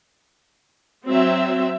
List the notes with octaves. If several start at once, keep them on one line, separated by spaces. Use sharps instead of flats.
F#3 C4 E5